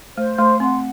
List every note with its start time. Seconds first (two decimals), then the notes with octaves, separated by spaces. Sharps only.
0.17 A3 C5
0.38 A3 C6
0.60 C4 F#5